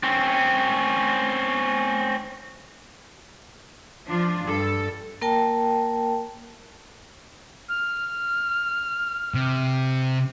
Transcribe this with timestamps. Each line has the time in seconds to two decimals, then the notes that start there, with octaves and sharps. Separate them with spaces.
0.03 C4 C#4
4.07 F3 D4 F4
4.44 G2 A4
5.22 A#3 A#4 G5 A5
7.68 F6
9.34 C3